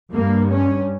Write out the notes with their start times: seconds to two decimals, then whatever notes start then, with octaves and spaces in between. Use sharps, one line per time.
0.11 G2 A#3
0.50 C#4